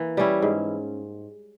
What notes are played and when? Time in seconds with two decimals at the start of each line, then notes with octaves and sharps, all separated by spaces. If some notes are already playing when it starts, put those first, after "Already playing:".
Already playing: E3 A#3
0.17 G3 C#4 E4
0.42 G#2